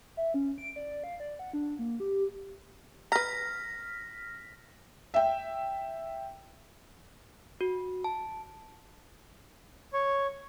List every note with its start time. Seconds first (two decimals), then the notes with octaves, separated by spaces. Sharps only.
0.17 E5
0.34 C#4
0.58 D7
0.76 D5
1.04 F5
1.20 D5
1.39 F#5
1.53 D4
1.79 A#3
2.00 G4
3.12 B4 A#5 F6 A#6 B6
5.14 E5 G5
7.61 F#4
8.04 A5
9.93 C#5